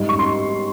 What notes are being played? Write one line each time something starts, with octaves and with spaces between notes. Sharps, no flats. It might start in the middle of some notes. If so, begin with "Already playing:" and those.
Already playing: G#2 G3
C#6
C6